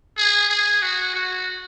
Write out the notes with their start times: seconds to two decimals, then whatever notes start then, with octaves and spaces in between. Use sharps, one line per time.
0.17 G#4
0.49 G#4
0.82 F#4
1.14 F#4